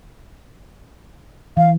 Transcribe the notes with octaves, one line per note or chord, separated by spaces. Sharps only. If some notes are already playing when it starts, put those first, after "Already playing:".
E3 F5